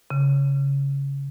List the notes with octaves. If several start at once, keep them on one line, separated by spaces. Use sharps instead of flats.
C#3